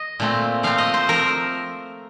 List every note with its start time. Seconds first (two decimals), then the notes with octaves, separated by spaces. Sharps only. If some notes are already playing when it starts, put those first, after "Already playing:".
Already playing: D#5
0.20 A#2 A3 C4
0.63 F3 A3 C4 F5
0.78 D#5
0.94 C5
1.08 F3 A3 C4 A#4